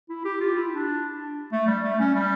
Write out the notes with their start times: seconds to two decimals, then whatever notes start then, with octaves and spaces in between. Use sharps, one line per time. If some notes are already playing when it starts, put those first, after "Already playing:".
0.09 E4
0.25 G4
0.41 F4
0.56 E4
0.73 D4
1.52 A3
1.67 G3
1.83 A3
1.99 C#4
2.15 G3